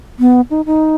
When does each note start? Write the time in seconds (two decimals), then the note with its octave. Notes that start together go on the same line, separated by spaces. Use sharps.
0.19 B3
0.50 D#4
0.66 D#4